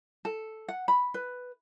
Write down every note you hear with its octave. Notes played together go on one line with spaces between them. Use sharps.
A4
F#5
B5
B4